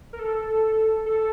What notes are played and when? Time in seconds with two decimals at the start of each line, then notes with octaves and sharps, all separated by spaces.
0.13 A#4
0.19 A4
1.06 A4